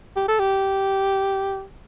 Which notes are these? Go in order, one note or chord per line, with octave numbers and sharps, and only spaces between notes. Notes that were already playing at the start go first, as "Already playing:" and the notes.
G4
A4
G4